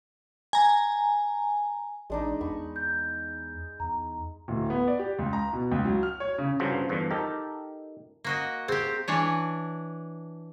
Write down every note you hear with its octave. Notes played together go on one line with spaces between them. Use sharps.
G#5 A#5
A1 G#3 D4 D#4
E2 B5 C#6
G6
E2 A#5
D1
B3
D5
G4
C#2
A#5
B2
C#2
F#3
F6
C#5
C#3
C2 G2 C#3 F3 F#4 C5
E2 G2 D3 F3
D#4 G4 A4 A#4
A#3 F#4 D#5
C4 G4 G#4
E3 D4 C#5